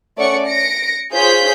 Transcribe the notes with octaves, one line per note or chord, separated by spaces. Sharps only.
A3 C#4 D5 F#5 C#6 C#7
A#6 C#7 D7
F4 G#4 C5 C#5 G6 B6